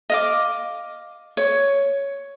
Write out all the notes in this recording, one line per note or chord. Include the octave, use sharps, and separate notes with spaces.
D#5 F5 D6
C#5